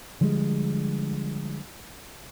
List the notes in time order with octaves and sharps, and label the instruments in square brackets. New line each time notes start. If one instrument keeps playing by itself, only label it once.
[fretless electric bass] D3 F3 G3 G#3